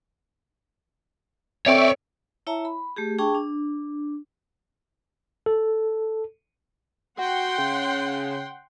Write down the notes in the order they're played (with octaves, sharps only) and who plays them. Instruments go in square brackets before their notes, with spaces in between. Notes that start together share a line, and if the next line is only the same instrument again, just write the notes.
[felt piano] C4 A4 G5 [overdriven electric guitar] C#5 D5 [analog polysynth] E5 C#6
[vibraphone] E4 C#5 E5 A5 A#5
B5
A3 G4 G#4
D4 G#4 G5 A5 C#6
D4
[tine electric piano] A4
[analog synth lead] F#4 [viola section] F#5 G5 C6
[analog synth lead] C#3